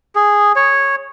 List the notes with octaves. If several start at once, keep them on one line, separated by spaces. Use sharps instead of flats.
G#4
C#5